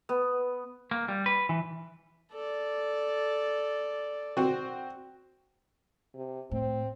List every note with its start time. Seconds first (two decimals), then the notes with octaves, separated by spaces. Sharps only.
0.09 B3
0.91 A#3
1.08 G3
1.26 B4
1.49 E3
2.32 A4 D5
4.37 C4 F#4
6.14 C3
6.51 A2 C4